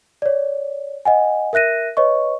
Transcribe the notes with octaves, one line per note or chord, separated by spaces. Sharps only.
C#5 D5
D#5 F#5 G#5
A#4 E5 F#6 A#6 D#7
B4 C#5 D#5 C#6